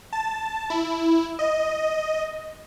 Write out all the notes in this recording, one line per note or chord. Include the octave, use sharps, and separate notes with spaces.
A5
E4
D#5